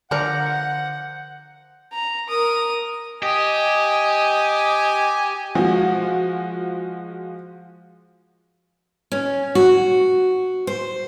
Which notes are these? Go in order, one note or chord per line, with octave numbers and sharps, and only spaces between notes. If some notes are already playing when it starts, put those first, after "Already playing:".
D3 F3 A#4 D5 F#5 G6 C#7
A#5
A#4 D#6
G4 D#5 G#5
F3 G#3 F#4
C#4
F#4
C5